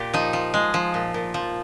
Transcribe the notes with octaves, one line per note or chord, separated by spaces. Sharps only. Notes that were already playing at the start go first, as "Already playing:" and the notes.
Already playing: A#2 G4
F3 D#4
F3
G#3
F3
A#2
A#2
F3